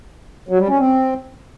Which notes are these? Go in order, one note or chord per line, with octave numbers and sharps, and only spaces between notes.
F#3
G3
C#4
C4